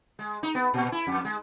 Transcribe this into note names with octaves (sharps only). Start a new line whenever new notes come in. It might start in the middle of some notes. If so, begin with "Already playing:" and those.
G#3
D#4
B3
A#2
E4
F2
G#3